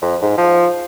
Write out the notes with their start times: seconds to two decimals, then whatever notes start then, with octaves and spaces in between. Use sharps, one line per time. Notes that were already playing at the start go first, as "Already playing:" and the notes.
0.02 F2
0.22 G#2
0.37 F3